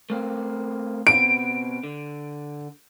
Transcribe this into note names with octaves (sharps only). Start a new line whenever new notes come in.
A3 A#3 C4
B2 B3 C4 D7
D3